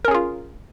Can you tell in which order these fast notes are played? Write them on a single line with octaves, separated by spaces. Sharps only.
A#4 C#4 G#4 F4